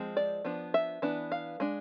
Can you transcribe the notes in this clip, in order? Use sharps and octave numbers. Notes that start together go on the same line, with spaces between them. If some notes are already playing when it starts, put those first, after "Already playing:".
Already playing: F3 G#3 C4
D5
F3 B3 D4
E5
E3 B3 D4
F5
G#3 D4